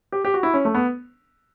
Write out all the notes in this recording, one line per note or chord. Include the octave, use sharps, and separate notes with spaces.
G4
G4
F#4
E4
C#4
A3
B3